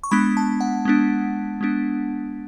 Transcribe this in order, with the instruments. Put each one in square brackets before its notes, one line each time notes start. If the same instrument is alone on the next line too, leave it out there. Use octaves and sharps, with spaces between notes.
[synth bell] C#6
G#3 B3 D4 B5
A5
F#5
G#3 B3 D4
G#3 B3 D4